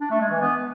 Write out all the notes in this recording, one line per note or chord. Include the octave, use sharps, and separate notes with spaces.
D4
A3
G#3
E3
B3